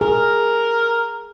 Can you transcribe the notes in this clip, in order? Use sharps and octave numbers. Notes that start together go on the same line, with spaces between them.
G#4 A#4